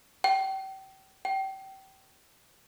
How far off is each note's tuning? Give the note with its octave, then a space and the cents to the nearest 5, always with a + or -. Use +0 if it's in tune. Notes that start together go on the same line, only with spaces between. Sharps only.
G5 -30
G5 -25